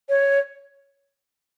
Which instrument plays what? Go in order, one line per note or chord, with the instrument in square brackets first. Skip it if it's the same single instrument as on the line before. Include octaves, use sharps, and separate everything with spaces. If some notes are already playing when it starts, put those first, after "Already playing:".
[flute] C#5